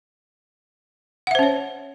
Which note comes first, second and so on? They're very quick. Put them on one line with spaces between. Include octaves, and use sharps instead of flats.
F#5 E5 C5 C#4 C#5